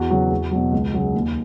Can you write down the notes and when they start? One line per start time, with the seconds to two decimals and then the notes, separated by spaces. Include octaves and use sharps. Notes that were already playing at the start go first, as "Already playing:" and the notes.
Already playing: E2 F#4
0.10 C#3 F#3
0.31 E2
0.51 B2 F#3
0.72 C#2
0.93 C#3 F#3
1.14 D#2